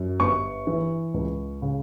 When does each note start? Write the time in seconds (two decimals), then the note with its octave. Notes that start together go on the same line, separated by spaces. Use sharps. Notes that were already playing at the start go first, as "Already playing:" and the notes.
Already playing: F#2
0.20 G1 C#6
0.67 E3
1.14 C#2
1.62 C#3